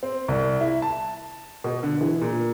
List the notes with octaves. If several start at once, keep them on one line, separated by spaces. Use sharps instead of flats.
C4
C2
E4
A5
B2
D3
E3
A#2